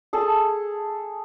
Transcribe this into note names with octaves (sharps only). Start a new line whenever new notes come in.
G#4 A4 A5